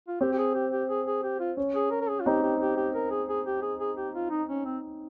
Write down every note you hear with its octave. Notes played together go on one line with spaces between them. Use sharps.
F4
C4 G4
G4
G#4
G4
G4
G#4
G#4
G4
F4
C#4
G#4
A#4
A#4
G#4
F4
C4 D#4 G4
G4
G4
G4
A#4
G#4
G#4
G4
G#4
G#4
G4
F4
D#4
C#4
C4